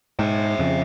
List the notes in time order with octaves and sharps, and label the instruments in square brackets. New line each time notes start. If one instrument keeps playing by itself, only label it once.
[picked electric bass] G#2 [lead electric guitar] E5 G5
[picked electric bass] F2 C#3